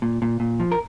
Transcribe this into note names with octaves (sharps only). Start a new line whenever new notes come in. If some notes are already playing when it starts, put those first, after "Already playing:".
A#2
A#2
A#2
F3
A#4